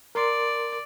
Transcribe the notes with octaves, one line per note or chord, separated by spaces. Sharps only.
A#4 D5 C6